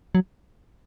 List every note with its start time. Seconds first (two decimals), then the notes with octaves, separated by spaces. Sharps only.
0.15 F#3